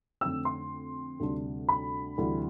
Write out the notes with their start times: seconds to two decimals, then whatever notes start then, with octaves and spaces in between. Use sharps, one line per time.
0.21 F2 D3 A3 C4 E6
0.45 C6
1.20 D2 C3 G3 D4
1.69 B5
2.18 D2 C3 E3 G3